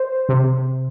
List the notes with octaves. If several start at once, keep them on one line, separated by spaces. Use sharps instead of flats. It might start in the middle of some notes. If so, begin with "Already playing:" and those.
Already playing: C5
C3